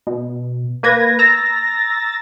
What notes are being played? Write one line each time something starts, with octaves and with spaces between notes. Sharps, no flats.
B2
A#3 B4 G#6 A#6
A#5 E6 A6 A#6